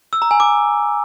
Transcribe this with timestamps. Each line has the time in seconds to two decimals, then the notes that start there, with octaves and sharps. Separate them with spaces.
0.13 E6
0.22 A#5
0.31 G#5
0.40 D6